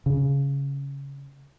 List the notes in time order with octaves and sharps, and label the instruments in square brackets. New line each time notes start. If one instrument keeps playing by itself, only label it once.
[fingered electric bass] C#3